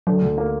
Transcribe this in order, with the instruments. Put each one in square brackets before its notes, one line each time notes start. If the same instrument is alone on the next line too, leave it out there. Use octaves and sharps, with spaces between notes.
[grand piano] D3 [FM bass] F#3
[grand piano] D2
A#3